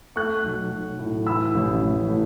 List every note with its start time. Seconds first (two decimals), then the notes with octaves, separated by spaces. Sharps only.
0.16 A3 C#6 F#6
0.44 B1
0.71 B1
0.99 A2
1.26 E3 B5 E6
1.55 A1
1.83 A1
2.09 A2